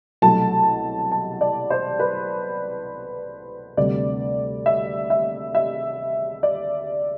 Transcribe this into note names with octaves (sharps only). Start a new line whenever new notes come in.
C2 B2 F#3 A3 A5
A5
D5
C5
B4
D2 C3 G3 D5
E5
E5
E5
D5